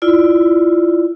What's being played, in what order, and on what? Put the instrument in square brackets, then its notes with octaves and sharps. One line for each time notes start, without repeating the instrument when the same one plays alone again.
[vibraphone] E4 F4 D5